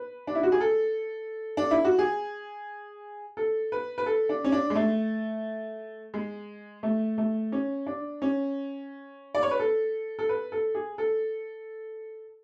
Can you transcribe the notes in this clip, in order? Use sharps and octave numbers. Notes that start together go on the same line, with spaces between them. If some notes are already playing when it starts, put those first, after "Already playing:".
Already playing: B4
D4
E4
F#4
G#4
A4
D4
E4
F#4
G#4
A4
B4
B4
A4
D4
C#4
D4
G#3
A3
G#3
A3
A3
C#4
D4
C#4
D5
C#5
B4
A4
A4
B4
A4
G#4
A4